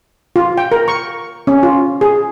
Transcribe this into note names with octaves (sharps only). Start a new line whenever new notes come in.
F4
G5
A#4
C#6
C#4
F4
G#4